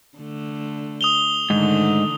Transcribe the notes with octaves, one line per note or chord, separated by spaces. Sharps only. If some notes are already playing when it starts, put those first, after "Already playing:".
D3 A3
D#6 F7 G7
G#2 D3 D#3 A3